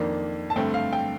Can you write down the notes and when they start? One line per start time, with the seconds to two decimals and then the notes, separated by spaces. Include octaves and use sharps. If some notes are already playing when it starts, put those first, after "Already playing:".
Already playing: F2 D#3 A#3 D4
0.50 A5
0.56 G2 D3 A3 C4 G5
0.74 F5
0.93 G5